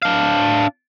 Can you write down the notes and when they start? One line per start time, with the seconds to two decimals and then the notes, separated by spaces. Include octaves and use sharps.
0.02 D4 F5